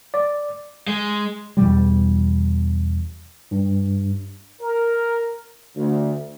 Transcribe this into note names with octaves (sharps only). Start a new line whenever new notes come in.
D5
G#3
E2 B2 E3 G3
G2
A#4
D2